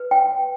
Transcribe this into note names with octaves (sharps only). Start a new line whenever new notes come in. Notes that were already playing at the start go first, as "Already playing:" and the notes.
Already playing: B4
G5